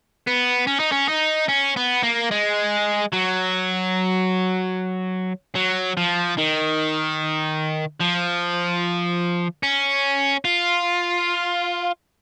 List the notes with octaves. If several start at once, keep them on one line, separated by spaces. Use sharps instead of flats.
B3
C#4
D#4
C#4
D#4
C#4
B3
A#3
G#3
F#3
F#3
F3
D#3
F3
C#4
F4